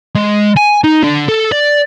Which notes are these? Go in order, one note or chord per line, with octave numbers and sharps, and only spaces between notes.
G#3
G#5
D#4
D3
A4
D5